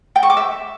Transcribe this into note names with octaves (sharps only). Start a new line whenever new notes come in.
G5
C#6
D6
E5